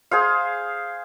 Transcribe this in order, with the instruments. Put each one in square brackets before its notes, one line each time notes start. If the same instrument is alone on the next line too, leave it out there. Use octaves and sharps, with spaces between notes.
[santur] G#4 C5 F5